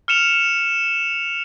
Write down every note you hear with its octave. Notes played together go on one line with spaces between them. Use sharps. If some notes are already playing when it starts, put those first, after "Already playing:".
F6 C#7 E7 F7